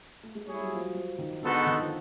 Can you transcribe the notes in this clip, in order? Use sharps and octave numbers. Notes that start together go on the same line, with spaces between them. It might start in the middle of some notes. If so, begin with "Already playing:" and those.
A3
G#3
G3 E4 G#4 C#5
G3
F#3
F3
F#3
F3
D#3
D3 G#3 B3 D#4 F#4 A4
D#3
F3